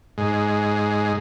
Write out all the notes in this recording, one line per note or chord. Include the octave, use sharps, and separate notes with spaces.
G#2